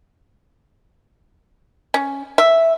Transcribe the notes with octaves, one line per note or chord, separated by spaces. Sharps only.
C#4
E5